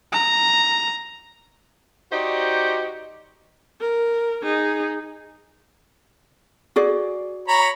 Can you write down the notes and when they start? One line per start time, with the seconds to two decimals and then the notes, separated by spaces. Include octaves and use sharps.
0.12 A#5
2.12 D#4 F#4 G4 C5 D5 D#5
3.80 A#4
4.42 D#4 G#4
6.76 F#4 G#4 D5
7.48 C#5 A#5 B5